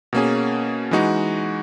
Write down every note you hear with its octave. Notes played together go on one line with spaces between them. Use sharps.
B2 A#3 C#4 G#4
E3 G#3 D#4 F#4